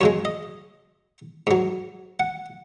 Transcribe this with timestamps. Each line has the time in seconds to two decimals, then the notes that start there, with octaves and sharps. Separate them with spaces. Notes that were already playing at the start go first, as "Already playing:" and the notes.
0.01 F#2 C#3 G#3 C#5
0.25 D#5
1.47 G#2 F#3
2.20 F#5